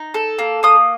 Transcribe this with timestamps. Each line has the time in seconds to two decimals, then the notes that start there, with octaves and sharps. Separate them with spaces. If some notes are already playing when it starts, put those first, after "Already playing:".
Already playing: D#4
0.14 A4
0.39 A#3
0.63 A#3 D#6